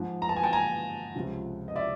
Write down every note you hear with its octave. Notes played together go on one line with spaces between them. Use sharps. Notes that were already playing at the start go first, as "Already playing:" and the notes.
Already playing: G#2 F3
A#5
A5
G#5
G5 A5
G#5 A#5
C#2 C3 F3
D#5
D5 E5